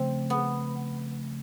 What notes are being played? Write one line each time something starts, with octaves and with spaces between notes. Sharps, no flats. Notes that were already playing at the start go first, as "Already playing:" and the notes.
Already playing: C#3 F3 A3 C4
B3